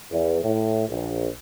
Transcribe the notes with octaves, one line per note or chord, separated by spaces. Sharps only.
E2
A2
A#1